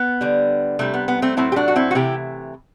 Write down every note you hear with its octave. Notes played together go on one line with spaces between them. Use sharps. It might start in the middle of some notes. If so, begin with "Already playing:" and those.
Already playing: B3
D3 G3
C3 G3 A3
B3
B3
A3 C4
A2 F#3 A3 C4 E4
G4
D4 F#4
F#4
C4 E4
F#4
C3 E3 A3 E4 G4